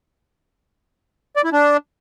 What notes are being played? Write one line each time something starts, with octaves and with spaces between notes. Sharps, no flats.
D5
E4
D4